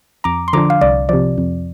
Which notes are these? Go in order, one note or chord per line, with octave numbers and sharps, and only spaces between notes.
F2 A#5 D6
C6
D3 F3 D4 A#5 D6
F5
C2 D5
C3 F3 D5
F2